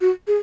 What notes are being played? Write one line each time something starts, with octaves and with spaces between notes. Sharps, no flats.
F#4
G#4